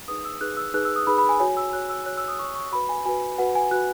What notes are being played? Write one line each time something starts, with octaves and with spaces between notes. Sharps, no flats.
D#4 G#4 B4 D#6
E6
D#4 G#4 B4 F#6
E6
D#4 G#4 B4 F#6
E6
D#6
D#4 G#4 B4 B5
B5
G#5
F#4 C#5 G#5
E6
F#4 C#5 F#6
E6
F#4 C#5 F#6
E6
D#6
F#4 C#5 C#6
C#6
F#4 B4 B5
G#5
F#4 B4 G#5
F#4 B4 F#5
G#5
F#4 B4 F#6